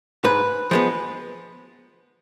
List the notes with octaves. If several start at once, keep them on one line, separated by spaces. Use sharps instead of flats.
G#2 B4
F3 G#3 B3